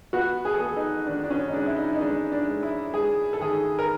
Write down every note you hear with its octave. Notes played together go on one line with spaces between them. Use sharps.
B3 F#4
G#4
A4
B3 G#4
D#4
D#3 D4
D4
C#4
D#4
G#3 D4
E4
D#4
D#4
G#3 D4
D4
G#3
E4
G#3 G#4
A4
D#3 G#4
A#4